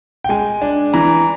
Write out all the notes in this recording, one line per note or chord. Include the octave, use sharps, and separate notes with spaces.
G5
G#3 G#5
D4
E3 A#5